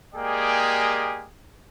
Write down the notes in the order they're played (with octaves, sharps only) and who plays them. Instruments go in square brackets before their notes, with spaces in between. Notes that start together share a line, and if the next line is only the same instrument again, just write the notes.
[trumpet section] G#3 A#3 G4 G#4 D5 G5